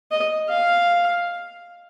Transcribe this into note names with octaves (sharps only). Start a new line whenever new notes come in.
D#5
F5